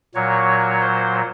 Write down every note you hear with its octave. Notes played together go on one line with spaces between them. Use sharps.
A#2 F#3 C#5
C5